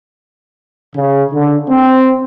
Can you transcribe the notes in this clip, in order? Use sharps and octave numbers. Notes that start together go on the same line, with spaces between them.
C#3
D3
C4